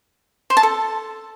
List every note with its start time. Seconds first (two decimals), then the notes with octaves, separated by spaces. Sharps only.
0.50 C5
0.57 A5
0.63 A4